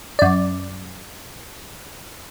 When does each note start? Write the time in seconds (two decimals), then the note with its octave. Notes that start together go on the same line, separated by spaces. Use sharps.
0.19 F#2 D5